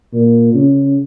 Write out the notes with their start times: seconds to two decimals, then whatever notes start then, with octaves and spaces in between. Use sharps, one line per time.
0.13 A#2
0.54 C#3